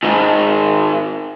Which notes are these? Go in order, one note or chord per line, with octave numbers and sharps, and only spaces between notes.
G#2 D#3